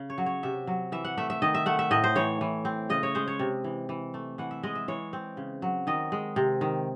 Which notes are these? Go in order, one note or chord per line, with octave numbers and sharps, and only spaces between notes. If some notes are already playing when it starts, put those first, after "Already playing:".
Already playing: C#3
C#5
F#3
C#5
C3 E5
F#3
E3 E5
F#5
A3 E5
E5
D#3 D#5
E5
A3 F#5
E5
A2 D#5
C5
E3 C#5
E3
C4
C#3 D#5
C#5
G#3 C5
C#5
C3
E3
E3
A3
E3 F#5
E5
G#3 D#5
E5
E3 C#5
C4
C#3
F#3
D#3 D#5
G#3
C3
D#3